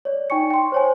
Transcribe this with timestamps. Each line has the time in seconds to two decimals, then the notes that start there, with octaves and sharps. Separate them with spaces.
0.05 C#5 D5
0.30 D#4 G5 G#5 C#6 C#7
0.50 G5 C6
0.72 C5 C#5 G#5